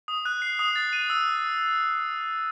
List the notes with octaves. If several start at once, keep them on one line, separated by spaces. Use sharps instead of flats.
D#6
F#6
C7
D#6
A6
D#7
E6